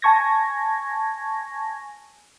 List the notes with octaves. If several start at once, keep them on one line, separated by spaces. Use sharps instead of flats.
G#5 A5 C#6 G#6 A#6